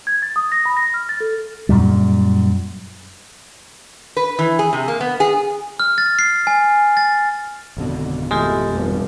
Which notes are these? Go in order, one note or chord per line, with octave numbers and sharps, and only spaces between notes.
G#6
A6
D#6
A#6
B5
A#6
F6
A6
A4
F#2 A#2 G3
B4
E3
G#4
C3
A#3
B3
G#4
F6
A6
C7
G#5
A6
G#1 F2 B2 D3
E3 G#3 A3 F4 G4 A4
F1 G2 F3